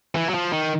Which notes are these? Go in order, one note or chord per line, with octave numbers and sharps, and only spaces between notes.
E3
F#3
F3
D#3